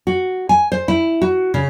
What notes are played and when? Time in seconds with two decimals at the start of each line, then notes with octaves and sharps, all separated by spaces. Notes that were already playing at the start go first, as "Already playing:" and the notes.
0.07 F#4
0.49 G#5
0.72 C5
0.88 E4
1.22 F#4
1.54 C#3